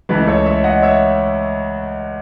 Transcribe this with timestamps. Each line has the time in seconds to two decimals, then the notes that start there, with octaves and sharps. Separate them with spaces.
0.09 C#2 C#3 E3 A3 B4
0.27 A4 C#5
0.46 C#5 E5
0.64 D#5 F#5
0.82 C#5 E5